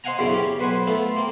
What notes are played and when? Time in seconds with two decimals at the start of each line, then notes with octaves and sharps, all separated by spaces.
0.04 C5 D#5 F5 F#5 G#5 A#5
0.19 B1 F#2 C#3 E4 D5
0.33 C#4 G4
0.59 B1 B4 C5 F#5 G#5
0.87 A3 B3 F4 A4
1.16 A#3 C4